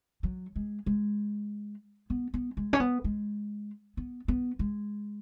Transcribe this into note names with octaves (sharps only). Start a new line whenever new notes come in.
F#3
G#3
G#3
B3
B3
G#3
C#4
B3
G#3
B3
B3
G#3